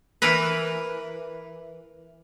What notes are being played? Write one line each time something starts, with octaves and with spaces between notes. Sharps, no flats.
E3 E4 A#4 B4